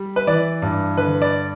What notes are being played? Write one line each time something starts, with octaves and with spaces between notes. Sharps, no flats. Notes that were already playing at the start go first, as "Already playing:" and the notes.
Already playing: G3
B4
E3 D5
G2
D3 B4
D5